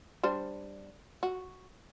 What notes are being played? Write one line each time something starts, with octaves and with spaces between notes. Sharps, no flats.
G3 D4 C5
F#4